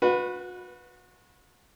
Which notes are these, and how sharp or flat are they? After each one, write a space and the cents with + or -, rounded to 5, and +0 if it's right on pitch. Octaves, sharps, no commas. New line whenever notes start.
F#4 -35 B4 +0